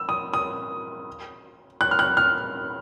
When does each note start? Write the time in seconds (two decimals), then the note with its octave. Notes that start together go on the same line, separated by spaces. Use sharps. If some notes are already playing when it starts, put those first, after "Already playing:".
Already playing: E6
0.09 D#6
0.34 D#6
1.81 F#6
1.91 F6
1.99 F#6
2.17 F6